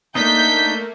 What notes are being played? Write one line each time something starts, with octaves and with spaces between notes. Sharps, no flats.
A3 A#3 D4 D#4 G6 B6